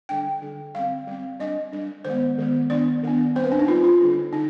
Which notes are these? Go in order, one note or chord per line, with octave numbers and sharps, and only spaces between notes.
D3 G3 D4 G5
D3 G3 D4
G3 C4 F5
G3 C4
G3 D4 D#5
G3 D4
D#3 G#3 B3 C5
D#3 G#3 B3
D#3 B3 D4 D5
D#3 B3 D4
G3 C4 C5
B4
D4
D#4
G3 C4 F4
F4
D3 G3 D4
D3 D#4